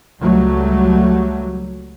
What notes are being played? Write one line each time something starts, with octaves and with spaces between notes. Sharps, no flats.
C#2 F#3 G3 A3